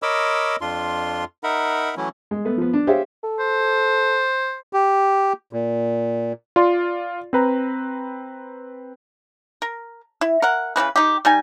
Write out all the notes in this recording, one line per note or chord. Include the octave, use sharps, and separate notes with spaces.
A#4 C#5 D#5 B5 D6 E6
F2 D4 F4 C6
D#4 A#4 E5 F#5 B5
E3 F#3 A3 C#4 E4
G#3
A3 B3
F3 B3
D4
G4 G#4 C5 C#5 E5 F5
A4
C5
G4
A#2
F4 D5 C6
C4 B4 A#5
A#4
E4
A#4 F#5
C#3 E3 C4 B4
D#4 G4
G3 D#4 G#5